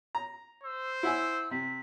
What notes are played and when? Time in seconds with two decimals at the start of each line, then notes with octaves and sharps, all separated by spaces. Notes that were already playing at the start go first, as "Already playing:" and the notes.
0.15 A#5
0.64 C5 E6
1.03 E4 F#5 G#5 E6
1.51 C3 B6